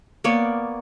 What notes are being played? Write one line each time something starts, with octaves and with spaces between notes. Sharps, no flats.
A#3 B3 C#5 D5